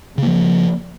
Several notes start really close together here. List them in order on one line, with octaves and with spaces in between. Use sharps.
C#3 A#3 F3